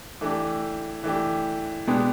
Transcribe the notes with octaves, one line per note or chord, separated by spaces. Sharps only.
E3 A3 D4 G4
E3 A3 D4 G4
B2 G#3 B3 D4 G4